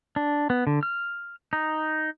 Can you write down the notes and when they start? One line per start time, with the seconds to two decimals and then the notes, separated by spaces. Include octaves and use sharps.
0.16 D4
0.50 B3
0.67 D3
0.83 F6
1.53 D#4